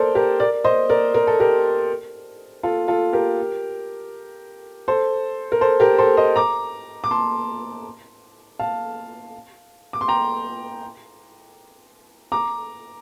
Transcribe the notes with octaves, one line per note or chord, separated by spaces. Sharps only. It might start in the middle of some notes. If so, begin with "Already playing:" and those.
Already playing: A4 A#4 C5 D5
G4 A#4
A#4 D5
C5 D#5
A#4 D5
A#4
A4
G4 A#4
F4 A4
F4 A4
G4 A#4
A4 C5
A#4
A4 C5
G4 A#4
A4 C5
C5 D#5
A#5 D6
D6
A5 C6
F5 A5
D6
C6
G5 A#5
A#5 D6